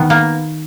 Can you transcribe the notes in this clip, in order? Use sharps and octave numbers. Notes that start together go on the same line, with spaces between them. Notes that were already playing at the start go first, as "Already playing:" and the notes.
Already playing: D#3 B3
A#3